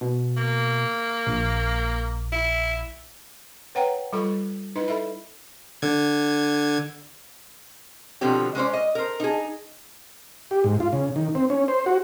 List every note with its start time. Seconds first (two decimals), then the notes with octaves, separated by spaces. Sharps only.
0.01 B2
0.37 A#3
1.27 A#1
2.32 E4
3.75 B4 C#5 F#5 G5 A#5
4.13 G3 F4 A4 B5 C#6
4.76 D#4 E4 B4 D#5
4.88 A4 E5 B5
5.82 D3 G#6
8.21 B2 D3 F3 C4 G4
8.55 G#3 C#4 C5 D5
8.73 D#5
8.95 A#4 C5
9.20 D#4 G#4
10.51 G4
10.64 G#2
10.80 F4
10.93 C#3
11.16 D#3
11.35 C4
11.50 C#4
11.68 C5
11.86 F#4